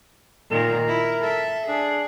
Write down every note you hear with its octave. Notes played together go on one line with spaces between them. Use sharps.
A#2 D#3 A#4
E4
A4 E5
D4 G#4